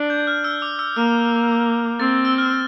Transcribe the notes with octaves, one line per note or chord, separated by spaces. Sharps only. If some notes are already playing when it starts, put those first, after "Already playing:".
Already playing: D4
G6
F6
E6
D6
E6
A#3 F6
C4 A6
E6
F6